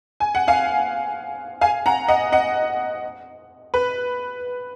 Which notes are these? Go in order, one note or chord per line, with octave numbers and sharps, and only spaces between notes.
G#5
F#5
F5 G#5
F5 G#5
F#5 A#5
D#5 F#5
D#5 F#5
B4